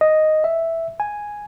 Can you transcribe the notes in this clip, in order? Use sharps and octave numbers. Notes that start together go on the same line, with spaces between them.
D#5
E5
G#5